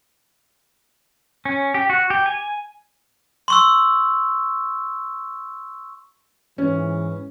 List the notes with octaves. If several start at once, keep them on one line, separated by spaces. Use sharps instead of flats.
C#4
G4
F#4
G4
G#5
C6 C#6 E6
G#2 E3 C#4